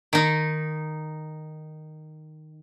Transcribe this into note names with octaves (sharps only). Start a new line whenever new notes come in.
D#3 D#4